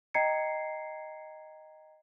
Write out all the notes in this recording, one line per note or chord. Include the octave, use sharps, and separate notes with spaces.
D#5 G5 A#5 G#6 C7 C#7